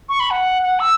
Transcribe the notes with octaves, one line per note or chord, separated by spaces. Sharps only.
C#6
B5
F#5
F#5
E6